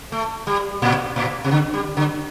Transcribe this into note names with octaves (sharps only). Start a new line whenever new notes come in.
A3
G3
A2
A2
C3
D3
G3
D3